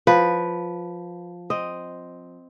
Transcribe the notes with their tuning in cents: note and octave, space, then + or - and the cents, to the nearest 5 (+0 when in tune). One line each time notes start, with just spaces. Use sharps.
F3 +10 B4 +0
C4 -5 D#5 +0